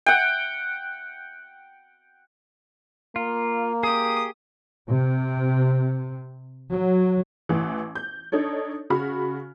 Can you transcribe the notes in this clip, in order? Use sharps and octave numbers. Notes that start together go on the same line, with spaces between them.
F#5 G5
A#3 F4
G4 G#4 D#6
C3
F#3
A1 E3
G6
D4 D#4 A4 C#5
C#3 F#4 B5 F6